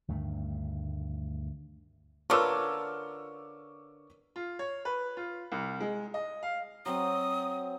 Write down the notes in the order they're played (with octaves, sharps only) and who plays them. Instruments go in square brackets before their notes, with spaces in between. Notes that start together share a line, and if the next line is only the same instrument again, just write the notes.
[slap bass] D2 G2 D#3 A3
[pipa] D3 F4 [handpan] A#4 B4 C#5 [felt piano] C#6 D6 E6
[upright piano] F4
C#5
B4
F4
C2
G#3
D#5
F5
[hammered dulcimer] F#3 C4 [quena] D#6